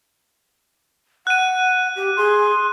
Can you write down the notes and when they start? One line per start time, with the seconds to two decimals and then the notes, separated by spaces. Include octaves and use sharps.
1.27 F#5 F#6 D#7
1.96 G4
2.17 G#4 C6